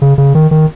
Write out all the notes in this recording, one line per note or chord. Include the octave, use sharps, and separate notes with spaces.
C#3
C#3
D#3
D#3